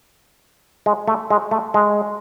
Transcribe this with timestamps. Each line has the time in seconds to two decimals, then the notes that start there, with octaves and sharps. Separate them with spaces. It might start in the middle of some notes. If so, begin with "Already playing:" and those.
0.86 G#3
1.08 A3
1.30 G#3
1.51 A3
1.74 G#3